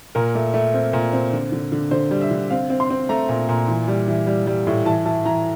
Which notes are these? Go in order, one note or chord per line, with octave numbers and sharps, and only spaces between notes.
A#2 A#4
A3
A3
C4
A#2
C4
D3
D3
D3
D3 C5
G3
E5
D3
C4 F5
C4
C6
C4
A3 A#5
A#2
A#2
E3
G3
E3
G3
G3
A2
E3 A5
E3 A5
E3 A#5